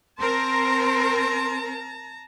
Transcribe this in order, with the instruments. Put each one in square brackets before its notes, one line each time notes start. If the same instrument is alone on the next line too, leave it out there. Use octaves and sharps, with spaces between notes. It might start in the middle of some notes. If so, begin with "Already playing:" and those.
[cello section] C4 A#4 [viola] A5 A#5 [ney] C6